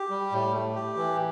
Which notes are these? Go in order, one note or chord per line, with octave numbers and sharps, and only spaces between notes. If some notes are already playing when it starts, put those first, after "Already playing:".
Already playing: G4
G3
A2
A3
G4
E3